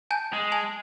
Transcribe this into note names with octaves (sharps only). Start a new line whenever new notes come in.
G#5 A5 G6
G#3
G#5 A5 F7